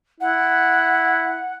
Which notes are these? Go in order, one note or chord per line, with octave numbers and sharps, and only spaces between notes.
E4 F#5